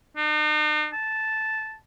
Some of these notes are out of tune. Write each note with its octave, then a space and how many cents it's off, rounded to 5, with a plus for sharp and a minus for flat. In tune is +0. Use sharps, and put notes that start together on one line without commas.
D#4 -45
A5 -5